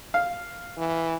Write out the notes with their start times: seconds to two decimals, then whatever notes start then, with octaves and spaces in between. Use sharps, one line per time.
0.14 F5
0.77 E3